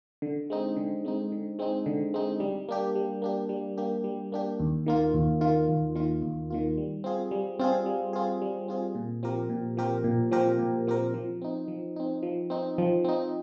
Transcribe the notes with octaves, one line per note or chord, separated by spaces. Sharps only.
D3
G#3 C4 D#4
D3
G#3 C4 D#4
D3
G#3 C4 D#4
D3
G#3 C4 D#4
G3
A#3 D4 G4
G3
A#3 D4 G4
G3
A#3 D4 G4
G3
A#3 D4 G4
D#2
D#3 A#3 F4
D#2
D#3 A#3 F4
D#2
D#3 A#3 F4
D#2
D#3 A#3 F4
G3
C4 F4 G#4
G3
C4 F4 G#4
G3
C4 F4 G#4
G3
C4 F4 G#4
A#2
F3 C4 G4 A#4
A#2
F3 C4 G4 A#4
A#2
F3 C4 G4 A#4
A#2
F3 C4 G4 A#4
F3
C4 D#4
F3
C4 D#4
F3
C4 D#4
F3
C4 D#4